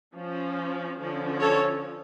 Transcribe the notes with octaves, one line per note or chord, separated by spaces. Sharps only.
F3 C#4
D3 F3 C#4
A4 C#5